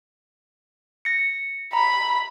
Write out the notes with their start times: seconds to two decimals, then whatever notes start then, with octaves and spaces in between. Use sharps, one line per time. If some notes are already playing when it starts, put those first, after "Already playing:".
1.05 A#6 C#7
1.73 A#5 B5